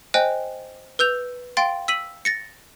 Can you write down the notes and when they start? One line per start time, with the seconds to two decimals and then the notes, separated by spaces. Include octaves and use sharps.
0.14 C5 D#5 G5 G#5 F#6
0.99 B4 E6 G6 F7
1.57 F5 G5 C6 A6 D7
1.88 E6 B6 D#7 F#7
2.25 A6 A#6 C#7